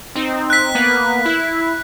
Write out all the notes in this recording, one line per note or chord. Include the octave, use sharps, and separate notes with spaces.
C4 D#4
F#6 B6
A#3 B3 B4
E4